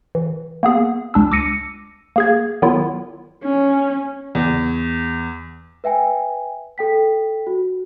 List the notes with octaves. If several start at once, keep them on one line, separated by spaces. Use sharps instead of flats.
E3
A#3 B3 G#4
C#2 D4 E6
D6 E6 A#6 C#7 D#7
A#3 G#4 G#6
D#3 F#3 B3 E4 F4
C#4
E2
B4 E5 G5 G#5
A4 G5 B6
F#4